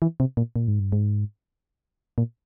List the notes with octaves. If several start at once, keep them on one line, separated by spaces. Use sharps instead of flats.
E3
C3
A#2
A#2
G#2
G2
G#2
A#2